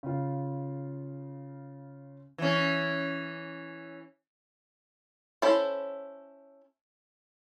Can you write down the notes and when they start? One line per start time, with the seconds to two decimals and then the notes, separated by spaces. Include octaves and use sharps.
0.03 C#3 F4
2.38 E3 C#4
5.42 C#4 E4 A4 C5